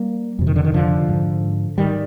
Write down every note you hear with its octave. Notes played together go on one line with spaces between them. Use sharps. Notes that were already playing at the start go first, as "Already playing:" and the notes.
Already playing: G3 A#3
F2 C3
D#3
D3
D#3
D3 F3
G#2
G#2 D#3 G3